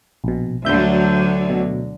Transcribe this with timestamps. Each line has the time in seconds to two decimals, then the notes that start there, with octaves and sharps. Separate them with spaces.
0.24 A#1 B2
0.65 D2 D3 F#3 E5 G6
1.50 B2